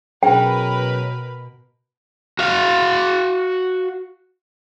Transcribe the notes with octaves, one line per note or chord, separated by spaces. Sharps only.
B2 F#3 C#4 G#4 A#4 B4 G5 B5
F#4 F5